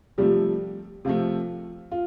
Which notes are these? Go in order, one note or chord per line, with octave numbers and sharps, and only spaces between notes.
C3 F3 G3 A3 G4
C3 F3 A3 F4
F4